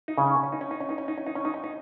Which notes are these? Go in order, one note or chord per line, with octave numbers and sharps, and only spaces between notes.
D#4
C#3 C#4
C#4
D#4
C#4
D#4
C#4
D#4
C#4
D#4
C#4
D#4
C#4
D#4
C#4
D#4